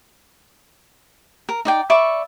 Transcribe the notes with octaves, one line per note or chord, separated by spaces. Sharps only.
A#4
D#4 D5 G5
D5 E5 B5 C#6